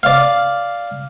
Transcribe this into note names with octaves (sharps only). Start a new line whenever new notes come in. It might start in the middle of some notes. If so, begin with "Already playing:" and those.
D5 F5